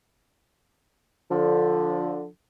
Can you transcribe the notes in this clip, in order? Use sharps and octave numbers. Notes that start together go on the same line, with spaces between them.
D3 F3